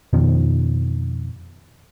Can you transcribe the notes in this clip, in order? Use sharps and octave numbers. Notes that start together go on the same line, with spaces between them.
F2 B2 D#3 F3